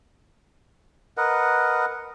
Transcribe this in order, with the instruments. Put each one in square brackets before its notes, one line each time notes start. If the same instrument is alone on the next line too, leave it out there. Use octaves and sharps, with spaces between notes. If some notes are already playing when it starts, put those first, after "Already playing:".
[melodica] A#4 B4 D#5 F#5